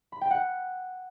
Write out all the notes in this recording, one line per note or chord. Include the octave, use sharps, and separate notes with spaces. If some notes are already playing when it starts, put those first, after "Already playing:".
B5
G5
F#5